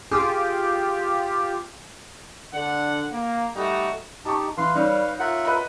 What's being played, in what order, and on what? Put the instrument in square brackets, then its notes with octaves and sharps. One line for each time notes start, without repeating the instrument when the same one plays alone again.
[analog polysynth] F4 G4 [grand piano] G#4
[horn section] D3 F#5
A#3
G3 A3 D#4 F#4
[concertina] D#4 G4 [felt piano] A5 C#6
[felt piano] E3 [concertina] B4 F5 [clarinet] C6
[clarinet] G3 [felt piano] D#4 C#5
[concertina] F4 A#4 E5 [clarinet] F#5
[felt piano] B4 D#5 B5